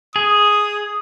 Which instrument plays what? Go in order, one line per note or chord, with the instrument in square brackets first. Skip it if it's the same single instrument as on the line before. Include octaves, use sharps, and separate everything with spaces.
[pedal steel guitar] G#4 [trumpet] D#6